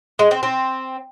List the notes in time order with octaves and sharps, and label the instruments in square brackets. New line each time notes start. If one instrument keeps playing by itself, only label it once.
[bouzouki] G#3
C4
C4